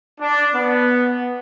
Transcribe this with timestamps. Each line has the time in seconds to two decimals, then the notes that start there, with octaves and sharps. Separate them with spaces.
0.20 D4
0.54 B3